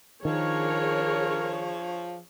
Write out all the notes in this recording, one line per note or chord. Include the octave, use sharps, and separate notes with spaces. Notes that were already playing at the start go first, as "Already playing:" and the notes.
D#3 F3 D4 G#4 A#4 C#5